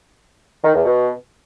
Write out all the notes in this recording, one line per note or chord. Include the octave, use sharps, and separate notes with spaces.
D#3
E2
B2